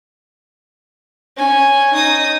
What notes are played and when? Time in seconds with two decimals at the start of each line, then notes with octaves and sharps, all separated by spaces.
1.37 C#4 G#5
1.93 D#4 D#6